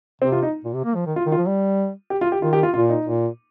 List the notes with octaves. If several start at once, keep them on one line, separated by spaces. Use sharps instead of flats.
C3 C4
F4
D#4
A#2
C3
A#3
F3
D#3
F4
D#3
F4
F3
G3
G4
F4
G4
D#3 F4
G4
F4
A#2 F4
D#4
A#2